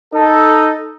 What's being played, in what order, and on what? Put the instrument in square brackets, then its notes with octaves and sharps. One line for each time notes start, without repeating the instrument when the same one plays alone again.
[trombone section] D#4 A4